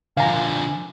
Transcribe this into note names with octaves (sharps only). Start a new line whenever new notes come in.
D3 F3 F5 G#5 A#5